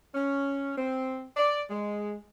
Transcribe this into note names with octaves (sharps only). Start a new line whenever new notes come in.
C#4
C4
D5
G#3